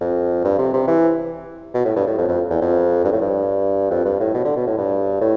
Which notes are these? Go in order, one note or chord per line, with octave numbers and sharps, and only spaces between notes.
F2
G2
C3
C3
E3
B2
A2
G2
A2
F2
F2
E2
F2
G2
A2
G2
F2
G2
A2
B2
D3
B2
A2
G2
A2